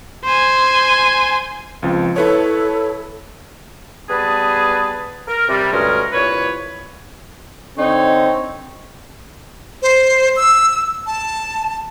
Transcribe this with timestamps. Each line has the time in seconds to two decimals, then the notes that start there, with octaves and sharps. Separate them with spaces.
0.25 C5 G#5
1.83 C#2 F3 C4
2.16 E4 A4 B4 C#5
4.09 G3 B3 G#4 B4 A5
5.27 A#4
5.48 C3 G3
5.71 D2 G2 G#3 C#4 A#4
6.12 C2 A#2 B4 C#5
7.78 D3 C4 D#4 C#5
9.82 C5
10.36 E6
11.06 A5